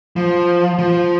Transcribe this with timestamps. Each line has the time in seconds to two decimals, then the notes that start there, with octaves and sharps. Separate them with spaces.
0.16 F3
0.78 F3